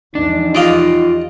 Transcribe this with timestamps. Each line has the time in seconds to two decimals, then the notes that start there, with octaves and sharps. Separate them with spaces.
0.15 E2 F3 G#3 D4 D#4
0.55 F4 G4 D5 D#5 F5